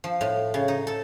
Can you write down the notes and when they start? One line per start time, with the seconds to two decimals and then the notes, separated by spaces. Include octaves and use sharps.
0.04 F3
0.21 A2
0.54 C#3
0.68 D#4
0.87 A4